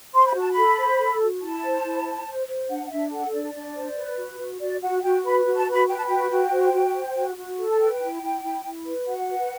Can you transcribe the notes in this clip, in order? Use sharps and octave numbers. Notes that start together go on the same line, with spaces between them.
C5 C6
B5
F#4 A5
B5
A4
C5
A4
F#4
E4 A5
C5
E4
C5
C5
C5
D4 F#5
F#5
D4 E5
A4 F#5
D4 D5
D4
C5
B4
F#4
F#4
F#4 D5
F#4 F#5
F#5
F#4 G5
B4 B5
F#4
A5
B4 B5
B4 G5
A5
F#4 G5
F#4
C5
F#4
C5
F#4
F#4
A4
A5
B4 G5
E4
E4
E4
E4
B4
F#4 F#5
B4